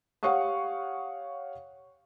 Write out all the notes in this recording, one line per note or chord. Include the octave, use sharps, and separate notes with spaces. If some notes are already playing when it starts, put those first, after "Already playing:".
G4 C#5 F5 F#5 C#6 D#6